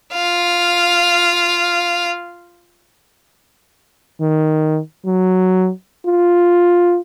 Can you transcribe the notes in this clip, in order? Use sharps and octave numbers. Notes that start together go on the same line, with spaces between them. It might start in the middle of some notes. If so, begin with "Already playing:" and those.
F4 F5
D#3
F#3
F4